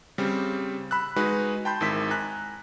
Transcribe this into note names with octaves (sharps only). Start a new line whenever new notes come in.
C#3 G3 C4
B5 E6 F#6
G#3 D#4 F#4 G#4 B4
G5 A5 B5 C6 G6
G#1 D#3 G#3 E4 E6 B6
G#5 A#5 F#6